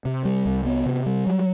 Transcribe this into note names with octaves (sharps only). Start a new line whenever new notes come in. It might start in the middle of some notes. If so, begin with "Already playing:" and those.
C3
G3
C2
B3
C3
G3
F#3